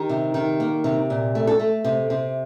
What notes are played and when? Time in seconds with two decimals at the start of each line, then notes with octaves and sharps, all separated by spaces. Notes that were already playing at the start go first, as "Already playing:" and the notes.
Already playing: D#3 G4
0.09 C3
0.34 D#3
0.60 A#3
0.84 C3
1.10 A#2
1.35 A3
1.47 A4
1.60 A3
1.84 C3
2.10 C3